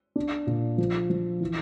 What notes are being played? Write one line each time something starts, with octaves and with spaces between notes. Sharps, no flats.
D4
A#2
F3
F3
E3